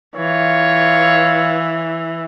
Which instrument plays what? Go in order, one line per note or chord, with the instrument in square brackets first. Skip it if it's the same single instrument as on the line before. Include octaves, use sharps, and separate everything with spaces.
[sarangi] E3 [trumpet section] F4 C#5